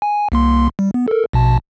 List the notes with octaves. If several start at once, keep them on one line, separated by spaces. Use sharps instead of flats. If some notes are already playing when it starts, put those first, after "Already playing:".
G#5
C2 A#3 C6
G3
B3
A4 A#4
A#1 B2 A5